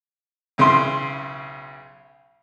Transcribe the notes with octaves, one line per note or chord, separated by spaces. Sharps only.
B1 C#3 E4 C6